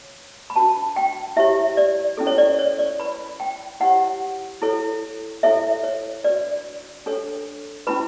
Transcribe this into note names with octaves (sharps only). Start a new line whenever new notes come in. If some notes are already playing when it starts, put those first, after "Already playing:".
Already playing: C#5
B5
D4 F#4 B4 A5
G5
E4 G4 C#5 E5
D5
C#4 E4 A4
C#5
D5
C#5
D5
E4 B4 B5
G5
E4 G4 C#5 F#5
E4 A4 C#5
E4 A4 C#5 E5
C#5
D4 F#4 B4 D5
D4 A4 C#5
C#4 E4 B4 B5